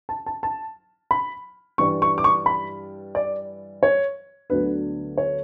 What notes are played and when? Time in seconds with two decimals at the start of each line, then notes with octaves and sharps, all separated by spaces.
0.09 A5
0.26 A5
0.43 A5
1.11 B5
1.78 G2 E3 G3 D4 C#6
2.02 C#6
2.18 D6
2.24 C#6
2.46 B5
3.15 D5
3.83 C#5
4.50 D2 D3 F#3 B3 D4 B4
5.18 C#5